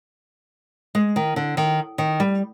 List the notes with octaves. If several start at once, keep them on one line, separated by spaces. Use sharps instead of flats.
G#3
D#3
D3
D#3
D#3
G3